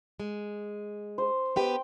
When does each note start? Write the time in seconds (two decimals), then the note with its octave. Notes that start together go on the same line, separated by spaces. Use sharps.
0.20 G#3
1.18 C5
1.56 B3 G4 B4 G5